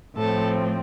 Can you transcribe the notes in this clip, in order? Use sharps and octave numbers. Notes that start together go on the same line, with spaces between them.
A2 F3 C4 A4